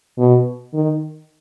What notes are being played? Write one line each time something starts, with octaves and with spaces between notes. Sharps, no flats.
B2
D#3